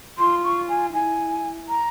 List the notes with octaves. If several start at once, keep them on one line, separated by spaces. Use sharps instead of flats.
F4 C6
C#6
G#5
E4 G#5
A#5